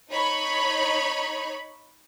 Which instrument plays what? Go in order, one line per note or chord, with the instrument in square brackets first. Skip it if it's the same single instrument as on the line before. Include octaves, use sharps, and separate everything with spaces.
[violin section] D#4 C#5 B5